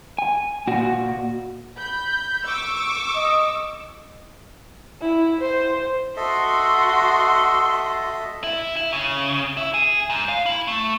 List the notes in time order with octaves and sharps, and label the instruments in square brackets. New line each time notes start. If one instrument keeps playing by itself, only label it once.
[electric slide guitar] G#5
A#2 F#4
[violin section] B5 G6
C#6 D6 E6
[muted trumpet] D#5
[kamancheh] E4
C5
[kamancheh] F#4 C6 [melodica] A4 D#5 E5
[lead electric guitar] E4
E4
C#3
E4
G#4
G#2
F5
E4
A3